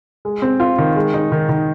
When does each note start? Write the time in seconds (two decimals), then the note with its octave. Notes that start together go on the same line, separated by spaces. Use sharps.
0.25 G#3
0.42 C4
0.60 F4
0.78 D#3
0.96 G#3
1.14 D#4
1.32 D#3
1.49 D#3